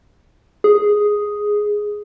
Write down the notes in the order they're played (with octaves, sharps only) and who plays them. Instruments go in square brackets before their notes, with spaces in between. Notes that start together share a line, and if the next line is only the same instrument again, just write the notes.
[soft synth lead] G#4